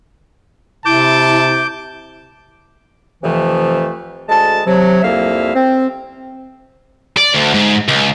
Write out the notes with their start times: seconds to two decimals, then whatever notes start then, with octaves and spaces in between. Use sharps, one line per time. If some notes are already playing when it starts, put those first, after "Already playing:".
0.86 C3 E4 A5 D6 G6
3.23 F2 C3 E3 F3 A3
4.29 D2 G#3 A5
4.66 C3 F#3
5.03 C2 F2 A#3 E5 F5
5.54 C4
7.17 D5
7.35 D2
7.54 G#2
7.88 C#2